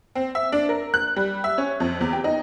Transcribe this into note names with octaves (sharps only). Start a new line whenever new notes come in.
C4
E5
D4
A#4
F#6
G3
E5
C#4
F2
E2
G4
D#4